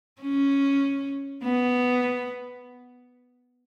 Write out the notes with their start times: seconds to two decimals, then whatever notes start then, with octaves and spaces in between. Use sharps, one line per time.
0.22 C#4
1.44 B3